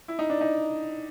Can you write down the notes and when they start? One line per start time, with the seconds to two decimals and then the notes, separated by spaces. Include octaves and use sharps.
0.08 E4
0.19 D#4
0.30 D4
0.41 D#4